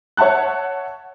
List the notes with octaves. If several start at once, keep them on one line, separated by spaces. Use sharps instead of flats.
C#5 E5 F#5 A5 F#6